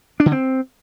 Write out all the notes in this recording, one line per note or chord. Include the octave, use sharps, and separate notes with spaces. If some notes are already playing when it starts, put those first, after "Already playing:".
D4
D3
C4